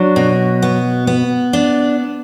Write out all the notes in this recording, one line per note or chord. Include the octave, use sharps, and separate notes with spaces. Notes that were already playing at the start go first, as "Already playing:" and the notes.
Already playing: F#3 D4
B2
B3
B3
D4